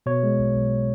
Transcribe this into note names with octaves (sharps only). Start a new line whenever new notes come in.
B2 C#5
G#3
B1
B1